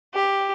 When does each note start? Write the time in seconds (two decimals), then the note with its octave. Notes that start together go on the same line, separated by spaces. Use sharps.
0.14 G4